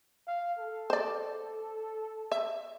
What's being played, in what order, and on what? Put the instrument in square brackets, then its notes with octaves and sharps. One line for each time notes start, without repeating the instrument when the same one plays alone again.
[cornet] F5
A4
[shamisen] C5 D5
E5